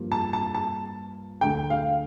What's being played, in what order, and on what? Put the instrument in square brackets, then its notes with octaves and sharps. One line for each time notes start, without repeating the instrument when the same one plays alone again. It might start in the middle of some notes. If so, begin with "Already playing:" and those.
Already playing: [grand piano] G2 F3 A#3 F4
[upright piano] A5
A5
A5
[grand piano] D2 D3 A3 [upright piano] G5
[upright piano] F5